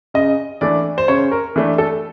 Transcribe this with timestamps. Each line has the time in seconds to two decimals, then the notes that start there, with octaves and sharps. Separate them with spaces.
0.14 C#3 D#5
0.61 E3 A3 D4 D5
0.98 C5
1.08 C#3 C#5
1.31 A#4
1.56 E3 A3 D4
1.78 A4